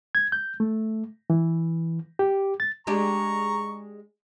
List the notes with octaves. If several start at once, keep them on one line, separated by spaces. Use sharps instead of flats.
G#6
G6
A3
E3
G4
A6
G#3 D4 G4 A#5 C#6